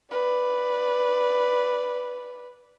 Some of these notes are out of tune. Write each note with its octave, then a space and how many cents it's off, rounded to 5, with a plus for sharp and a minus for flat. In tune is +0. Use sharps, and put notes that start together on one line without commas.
B4 +0 D5 -5